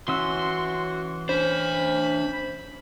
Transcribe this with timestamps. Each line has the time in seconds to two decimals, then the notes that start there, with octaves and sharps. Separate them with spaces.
0.08 E3 C#4 F#4 C6 E6
1.29 D4 C5 C#5 B5